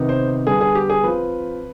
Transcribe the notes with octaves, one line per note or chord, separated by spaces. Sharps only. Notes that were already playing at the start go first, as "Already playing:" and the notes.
Already playing: C3 D#3 B3 D#4
C5
D3 G3 B3 G#4
G#4
G4
G#4
F3 C4 F4 B4